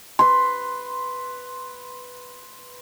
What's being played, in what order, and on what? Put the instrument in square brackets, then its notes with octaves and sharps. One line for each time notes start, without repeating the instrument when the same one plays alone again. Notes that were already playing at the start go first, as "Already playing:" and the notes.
[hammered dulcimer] B4 C6